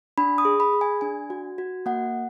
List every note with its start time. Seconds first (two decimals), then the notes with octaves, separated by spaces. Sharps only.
0.18 D4 B5
0.38 D#6
0.45 G#4
0.60 B5
0.73 G#4
0.81 G#5
1.01 D4 G#5
1.30 F#4
1.58 F#4
1.86 A#3 F#5